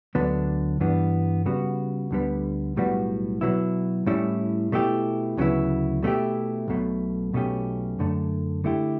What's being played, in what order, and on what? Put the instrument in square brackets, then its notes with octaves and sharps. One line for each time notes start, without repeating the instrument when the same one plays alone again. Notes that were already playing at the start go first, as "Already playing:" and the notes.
[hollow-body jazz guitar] D2 D3 F#3 B3 D4
G2 E3 G3 B3 D4
C#3 G3 B3 F#4
D2 D3 G3 B3
B1 A2 G3 B3 F#4
B2 F#3 B3 E4
A2 G3 C#4 E4
B2 A3 E4 G4
D2 C#3 F#3 B3 E4
B2 A3 C#4 E4 G4
B1 B2 A3
B1 B2 A3 C#4 G4
F#2 D3 A3
D3 A3 E4 G4